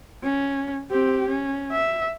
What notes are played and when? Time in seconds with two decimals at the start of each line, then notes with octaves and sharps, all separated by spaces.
0.23 C#4
0.91 C4 G4
1.28 C#4
1.72 E5